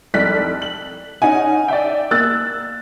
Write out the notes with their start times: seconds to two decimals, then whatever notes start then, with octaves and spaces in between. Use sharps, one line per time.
0.14 F1 C2 A4 D5 F#6 B6
0.62 F#7
1.22 C#4 D#4 F#5 G#5
1.68 D5 E5 G5
2.11 A#3 E6 F#6 A6